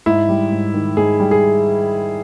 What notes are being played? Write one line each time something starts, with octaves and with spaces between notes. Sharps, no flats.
G#2 E4
G3
G#2
D#3
G#2 G#4
G3
G#4